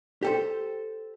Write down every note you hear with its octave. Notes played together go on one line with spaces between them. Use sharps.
G4 A4 C5